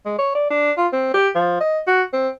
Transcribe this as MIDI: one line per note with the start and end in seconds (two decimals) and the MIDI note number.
0.06 0.17 56
0.18 0.33 73
0.35 0.48 74
0.51 0.72 62
0.78 0.87 65
0.93 1.10 60
1.14 1.28 67
1.35 1.58 53
1.60 1.79 75
1.88 2.03 66
2.13 2.29 60